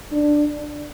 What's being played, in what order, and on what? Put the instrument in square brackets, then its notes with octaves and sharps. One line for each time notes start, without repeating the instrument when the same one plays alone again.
[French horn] D4